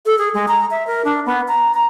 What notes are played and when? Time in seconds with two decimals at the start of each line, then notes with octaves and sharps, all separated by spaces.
0.06 A4
0.19 G#4
0.34 G#3
0.48 A#5
0.71 E5
0.87 A#4
1.05 D4
1.26 B3
1.48 A#5
1.74 A#5